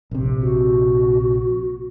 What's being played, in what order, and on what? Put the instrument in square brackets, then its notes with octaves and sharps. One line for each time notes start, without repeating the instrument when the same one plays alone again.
[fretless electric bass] A#1 C3
[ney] F#4